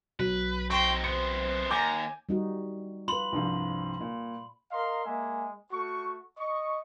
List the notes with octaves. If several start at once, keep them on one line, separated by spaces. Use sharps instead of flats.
B1 F#3 B4
C4 D#4 G5 C6 C#6
C3 B3 C5 C#7
D#2 G#5 A#5 D6 G6
G3 D#4 F#4
F4 B4 B5 C6 F#7
C2 G2 F3
A#2
A#4 D#5 F5 A#5 C6
G#3 A#3 E5 G#5
A3 F#4 C#6
D#5 C#6